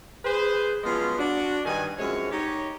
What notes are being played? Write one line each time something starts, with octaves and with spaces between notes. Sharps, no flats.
G#4 B4 C5
F3 F#3 G#3 B3 C#4 F4
D4 F#4
G2 D#3 G#5
F#2 C3 F3 G#3 C#5
D#4 G4 C#5